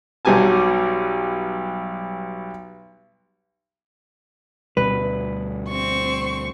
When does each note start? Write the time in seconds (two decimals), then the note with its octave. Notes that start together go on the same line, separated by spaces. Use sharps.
0.25 B1 F#3 G3 G4 G#5 A5
4.77 D2 B2 G3 B4
5.68 C4 C#6